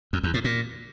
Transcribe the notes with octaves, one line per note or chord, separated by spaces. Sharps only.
F2
E2
A2
A#2